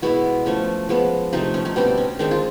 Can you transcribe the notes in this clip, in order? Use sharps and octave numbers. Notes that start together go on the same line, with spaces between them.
B2 G#3 B3 E4 F#4
F3 A3 C#4
F3 G#3 B3
C3 F3 A3 D#4 F4
C#4
C#4 D#4
B2 G3 C4 D4
C#4
D#3 G#3 C4 D4
F4